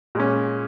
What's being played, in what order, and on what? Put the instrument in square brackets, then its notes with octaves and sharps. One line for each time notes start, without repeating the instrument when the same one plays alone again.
[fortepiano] A#2 G#3 C#4